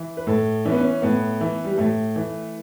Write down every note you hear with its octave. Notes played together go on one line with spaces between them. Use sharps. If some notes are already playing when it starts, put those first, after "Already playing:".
Already playing: E3
B4
A2 A4
E3 C#4
B3
C#4
A2 B3
E3
G3
A2 A3
E3